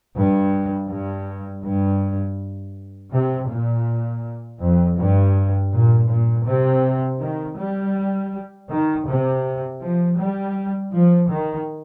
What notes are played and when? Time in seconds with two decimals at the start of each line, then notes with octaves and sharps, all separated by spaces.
0.15 G2
0.89 G2
1.63 G2
3.12 C3
3.49 A#2
4.60 F2
4.98 G2
5.72 A#2
6.10 A#2
6.47 C3
7.21 D#3
7.58 G3
8.70 D#3
9.07 C3
9.81 F3
10.19 G3
10.93 F3
11.30 D#3